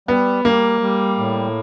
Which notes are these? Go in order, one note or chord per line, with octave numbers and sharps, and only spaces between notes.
G3 B3
G3 A#3
G3
A2